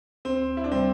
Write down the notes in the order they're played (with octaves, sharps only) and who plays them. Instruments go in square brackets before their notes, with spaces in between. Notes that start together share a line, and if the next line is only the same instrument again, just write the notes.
[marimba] D2 [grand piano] C4
[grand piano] E4
D4
[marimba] C3 G3 [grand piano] C4